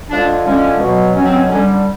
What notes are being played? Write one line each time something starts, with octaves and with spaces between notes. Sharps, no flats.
D3 F3 G#3 D4
D3 F3 G#3 C#4
B2 F#3
B2 F#3 C#4
C4
C#4
D3 G3 C#4